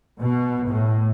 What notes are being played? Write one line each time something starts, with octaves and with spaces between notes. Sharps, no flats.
B2
A2